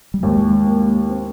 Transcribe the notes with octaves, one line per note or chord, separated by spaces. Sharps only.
G3
D#2 G#3
A#3
C4